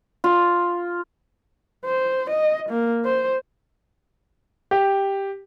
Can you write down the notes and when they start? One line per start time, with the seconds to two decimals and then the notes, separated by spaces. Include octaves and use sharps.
0.24 F4
1.86 C5
2.30 D#5
2.70 A#3
3.05 C5
4.71 G4